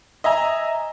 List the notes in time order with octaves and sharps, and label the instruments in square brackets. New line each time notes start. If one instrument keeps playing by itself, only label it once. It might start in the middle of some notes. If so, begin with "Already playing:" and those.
[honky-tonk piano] D#5 E5 G#5 A#5